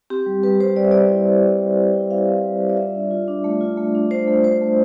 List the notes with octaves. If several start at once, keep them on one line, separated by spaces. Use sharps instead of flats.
C4 G4
G3
G3 B4
G3 C5
G3 D5
E5
G3 D5
E4
G3
C4
G3
G3
E4
E4 F5
C4
G3
G3
D5
F4 E5
D4
F4
D4
A3
F4
A3
D4
D4 C5
A3
A3 C5
A3